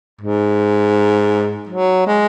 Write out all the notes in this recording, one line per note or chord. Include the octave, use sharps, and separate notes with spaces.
G#2
F#3
G#3